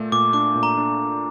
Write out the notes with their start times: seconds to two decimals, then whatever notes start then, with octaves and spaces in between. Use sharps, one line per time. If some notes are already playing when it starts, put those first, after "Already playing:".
Already playing: A#2 A3 A4
0.12 A#2 D6
0.33 D4 D6
0.55 A#2
0.63 A#5
0.78 D4